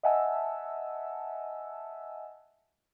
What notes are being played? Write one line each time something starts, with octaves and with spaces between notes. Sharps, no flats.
D#5 E5 F#5 G#5 A5 E6